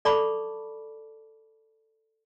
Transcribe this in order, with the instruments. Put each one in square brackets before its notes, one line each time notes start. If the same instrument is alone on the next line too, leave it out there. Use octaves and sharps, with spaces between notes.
[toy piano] A4 D5 A5 B5 C#6 D6